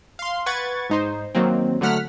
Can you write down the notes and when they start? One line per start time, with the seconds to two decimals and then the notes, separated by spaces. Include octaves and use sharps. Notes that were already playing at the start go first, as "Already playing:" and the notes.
0.19 F5 C6
0.46 B4 F#5 C#6 G#6 A6
0.89 G#2 D#4 C5
1.35 D#3 F#3 A#3 C4
1.81 D3 F#3 A3 F#5 F6 B6